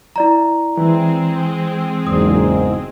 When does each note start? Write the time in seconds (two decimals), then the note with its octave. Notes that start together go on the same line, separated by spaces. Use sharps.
0.16 E4 D5 A#5
0.77 E3 G#3 C4 G#4
2.07 F#1 E2 G#2 D#6